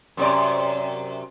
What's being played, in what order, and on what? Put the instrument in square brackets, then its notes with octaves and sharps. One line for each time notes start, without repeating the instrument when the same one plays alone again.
[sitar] F#2 C3 D5